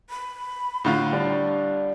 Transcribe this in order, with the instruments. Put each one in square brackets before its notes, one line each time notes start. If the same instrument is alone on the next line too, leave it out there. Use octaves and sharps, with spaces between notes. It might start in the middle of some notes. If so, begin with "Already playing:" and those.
[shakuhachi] B5
[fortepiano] A2 D3 F4
[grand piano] G3 D4